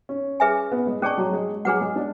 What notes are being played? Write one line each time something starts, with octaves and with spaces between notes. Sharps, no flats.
C#4
G#4 B4 E5 G#5
B3
G#3
G#3 C#4 G#4 D5 A5 C#6
F#3
G#3
F#3 D4 G#4 B4 F#5
G#3
D4